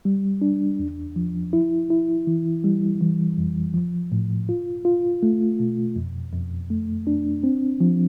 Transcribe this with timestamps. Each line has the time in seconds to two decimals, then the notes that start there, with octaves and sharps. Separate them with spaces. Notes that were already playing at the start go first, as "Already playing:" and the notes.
0.05 G3
0.42 D4
0.79 E2
1.16 F3
1.53 E4
1.90 E4
2.27 E3
2.64 G3
3.01 E3
3.38 F2
3.74 F3
4.12 A2
4.49 F4
4.85 F4
5.23 A3
5.60 B2
5.96 F2
6.33 F2
6.70 A3
7.07 D4
7.44 C4
7.80 F3